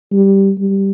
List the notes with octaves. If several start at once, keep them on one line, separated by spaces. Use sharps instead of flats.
G3
G3